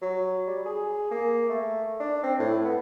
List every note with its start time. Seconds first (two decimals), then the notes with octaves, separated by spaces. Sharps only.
0.02 F#3
0.47 G3
0.65 G#4
1.11 A#3
1.50 A3
2.00 D4
2.23 C4
2.39 A2
2.65 B3